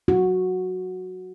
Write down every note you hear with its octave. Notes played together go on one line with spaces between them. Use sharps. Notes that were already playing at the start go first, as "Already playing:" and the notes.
F#4